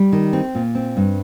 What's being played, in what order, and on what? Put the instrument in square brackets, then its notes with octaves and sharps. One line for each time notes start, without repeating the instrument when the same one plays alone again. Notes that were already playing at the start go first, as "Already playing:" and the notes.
Already playing: [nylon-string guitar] G3
D#3
C4
A#2
C4
G2